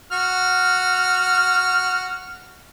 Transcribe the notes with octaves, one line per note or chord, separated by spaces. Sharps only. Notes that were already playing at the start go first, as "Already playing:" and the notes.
F#4 F6